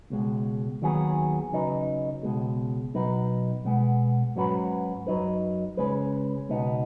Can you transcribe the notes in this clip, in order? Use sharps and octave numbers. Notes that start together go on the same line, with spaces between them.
C#2 B2 G#3
D#2 D#3 F#3 B3 G#4
C#3 F#3 D#4 B4
C#2 B2 G#3
B2 F#3 D#4 B4
B2 G#3 B3
G#2 F#3 C#4 F#4 B4
F#2 F#3 D#4 B4
C#3 G#3 C#4 B4
C#2 B2 B3 D#4